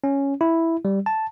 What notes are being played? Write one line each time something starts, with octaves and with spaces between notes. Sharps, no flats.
C#4
E4
G3
A5